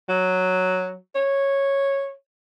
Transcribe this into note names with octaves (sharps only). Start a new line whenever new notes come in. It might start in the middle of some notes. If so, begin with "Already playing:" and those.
F#3
C#5